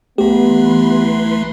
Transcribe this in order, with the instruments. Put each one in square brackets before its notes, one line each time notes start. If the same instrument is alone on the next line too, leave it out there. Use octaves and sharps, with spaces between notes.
[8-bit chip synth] B1 A3 [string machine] E3 B4 C6 [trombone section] B3 [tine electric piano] G4